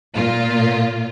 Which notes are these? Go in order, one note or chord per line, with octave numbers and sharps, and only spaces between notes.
A#2 F4